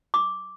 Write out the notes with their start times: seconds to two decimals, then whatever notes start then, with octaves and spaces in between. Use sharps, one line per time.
0.14 D6